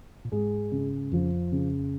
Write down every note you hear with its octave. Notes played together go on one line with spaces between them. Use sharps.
A#2
G#2 G#3
C#3
F2 F3
C#3